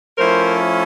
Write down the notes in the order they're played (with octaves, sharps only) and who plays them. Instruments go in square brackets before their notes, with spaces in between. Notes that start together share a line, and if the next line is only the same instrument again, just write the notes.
[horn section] F3 A3 C#4 E4 A#4 C5